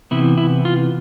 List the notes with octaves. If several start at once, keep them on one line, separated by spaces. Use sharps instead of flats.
C3 E3 B3 E4
E4
F4